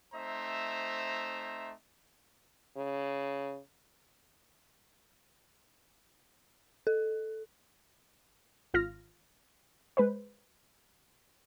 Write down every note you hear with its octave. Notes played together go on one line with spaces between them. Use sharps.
A3 C4 D#4 C5 E5 A#5
C#3
A4
G#1 F4 F6 A#6
G#3 B4 C5